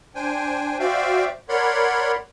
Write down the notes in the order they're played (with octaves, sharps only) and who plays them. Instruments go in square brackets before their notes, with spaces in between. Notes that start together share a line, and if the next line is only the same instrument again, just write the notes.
[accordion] D4 C5 G5 G#5
F#4 C5 D5 E5 F5 G5
A#4 C#5 D5 F#5 B5 C6